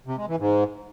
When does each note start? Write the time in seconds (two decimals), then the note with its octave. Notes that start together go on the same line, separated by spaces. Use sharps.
0.06 C3
0.17 G#3
0.28 E3
0.39 G#2